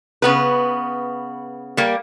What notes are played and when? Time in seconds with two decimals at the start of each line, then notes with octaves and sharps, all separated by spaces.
0.22 C#3 B3 B4
1.77 G3 A#3